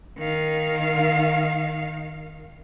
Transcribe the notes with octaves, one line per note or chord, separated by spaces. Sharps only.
D#3 F5